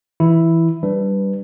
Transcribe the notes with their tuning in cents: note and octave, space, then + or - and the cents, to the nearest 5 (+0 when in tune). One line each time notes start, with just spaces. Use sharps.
E3 +0 E4 +0
G3 -10 D4 +0 B4 +0